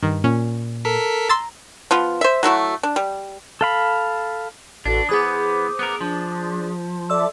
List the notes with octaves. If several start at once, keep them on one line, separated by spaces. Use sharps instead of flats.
G2 D#3
A#2 C#4
A4 A#4 B6
A#5 C6 E6 A6
F3 B3 F4
C5 E5
F#3 A3 E4 F#4
D4
G3
A4 F5 B5
A1 D4 F#4 A4 B4
E3 B3 G#4 C5 D6 D#6
B3 A#4
F3 D4
A4 D5 E5 D6 E6